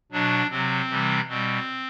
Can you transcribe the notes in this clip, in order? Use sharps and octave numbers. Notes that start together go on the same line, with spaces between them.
B2 F#3 D4
C3 F#3 C4
C3 E3 G3
B2 G3 C4